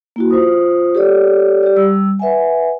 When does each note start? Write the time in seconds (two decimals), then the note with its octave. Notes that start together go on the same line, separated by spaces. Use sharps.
0.16 A#3 E4 F#4
0.30 F4 C5 D#6
0.95 G4 A4 C#5 D5
1.63 G4 D5
1.76 G3 E6
2.19 B4 E5 F#5 G#5